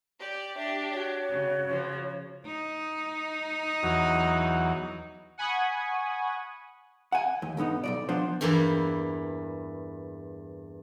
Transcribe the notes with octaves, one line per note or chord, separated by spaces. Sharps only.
G4 D5
D4 G4 E5
F#4 C#5
C#3
C#3 F3
D#4
E2 F#3
F#5 G#5 B5 C#6 D#6
F#5 G#5
D#2
B1 G2 B3 D#4
B1 G2 D5
F3 B3 D4 C5
E2 G2 E3 A#3 E4